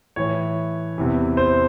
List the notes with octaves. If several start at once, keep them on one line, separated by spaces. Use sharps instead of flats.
A2 E3 C#5
E2 C3 E3
C5